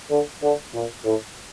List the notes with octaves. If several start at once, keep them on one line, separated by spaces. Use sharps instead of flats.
D3
D3
A#2
A2